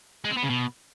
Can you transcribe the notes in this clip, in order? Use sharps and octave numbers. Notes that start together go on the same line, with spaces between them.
G#3
C4
B3
C#3
B2